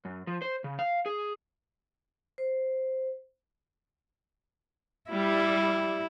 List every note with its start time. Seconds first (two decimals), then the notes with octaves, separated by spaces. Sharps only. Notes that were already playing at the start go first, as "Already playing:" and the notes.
0.05 F#2
0.27 F3
0.42 C5
0.64 C#3
0.79 F5
1.06 G#4
2.38 C5
5.10 G3 E4